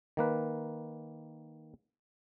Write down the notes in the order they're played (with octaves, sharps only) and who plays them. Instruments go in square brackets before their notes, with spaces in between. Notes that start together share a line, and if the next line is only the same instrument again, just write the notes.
[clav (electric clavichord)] D#3 A#3 B4